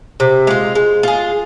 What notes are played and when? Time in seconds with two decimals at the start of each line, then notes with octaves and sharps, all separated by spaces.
0.20 C3
0.47 G#3 F4
0.75 G#3
1.03 F4 G#4